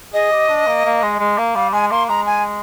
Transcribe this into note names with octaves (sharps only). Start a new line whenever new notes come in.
G#4 D#5
G4
D4
A#3
A#3
G#3
G#3
A#3
G3 F5
G#3 G#5
A#3 C6
G#3 A#5
G#5